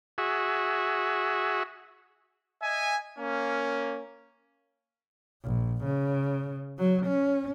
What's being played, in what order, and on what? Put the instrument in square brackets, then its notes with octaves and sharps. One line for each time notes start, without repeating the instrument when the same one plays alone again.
[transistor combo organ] F#4 G#4 E5
[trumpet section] D#5 E5 G#5
A#3 C#4
[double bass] A#1
C#3
F#3
C#4